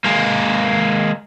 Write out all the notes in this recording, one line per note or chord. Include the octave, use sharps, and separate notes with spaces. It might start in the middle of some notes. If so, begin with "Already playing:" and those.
G#3 A#3